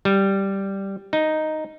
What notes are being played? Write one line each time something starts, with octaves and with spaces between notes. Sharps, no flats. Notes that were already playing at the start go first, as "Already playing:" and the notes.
G3
D#4